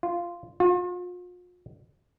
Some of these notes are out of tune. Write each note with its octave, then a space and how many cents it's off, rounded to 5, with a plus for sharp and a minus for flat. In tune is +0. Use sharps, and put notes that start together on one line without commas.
F4 -10
F4 +40